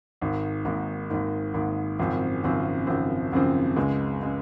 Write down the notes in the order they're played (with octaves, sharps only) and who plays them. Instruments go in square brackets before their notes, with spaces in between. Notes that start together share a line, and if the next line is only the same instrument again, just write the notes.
[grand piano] G#1 G#2 D#3
G#1 G#2 D#3
G#1 G#2 D#3
G#1 G#2 D#3
G#1 F#2 C#3 F3 C4
G#1 F#2 C#3 F3 C4
G#1 F#2 C#3 F3 C4
G#1 F#2 C#3 F3 C4
C#2 C#3 G#3
C#3 G#3